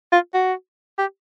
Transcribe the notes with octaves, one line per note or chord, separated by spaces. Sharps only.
F4
F#4
G4